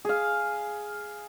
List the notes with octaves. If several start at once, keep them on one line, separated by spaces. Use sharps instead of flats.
G#4 F5